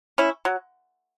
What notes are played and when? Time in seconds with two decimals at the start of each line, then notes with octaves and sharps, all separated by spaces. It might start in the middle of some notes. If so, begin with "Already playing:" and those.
0.18 C#4 E4
0.45 F#3